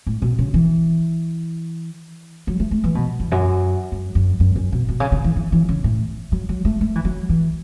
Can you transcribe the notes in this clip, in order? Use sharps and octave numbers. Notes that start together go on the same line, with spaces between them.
A2
B2
C#3
E3
F#3
A3
A3
E3
B2
E2
F#2
F#2
F#2
F#2
F#2
B2
B2
C#3
C#3
E3
E3
E3
C#3
A2
F#3
F#3
A3
A3
E3
F#3
E3